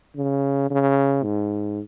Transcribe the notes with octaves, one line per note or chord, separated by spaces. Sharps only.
C#3
C#3
G#2